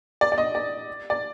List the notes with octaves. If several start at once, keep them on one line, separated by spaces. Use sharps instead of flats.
D5
D5
D#5
D5
D5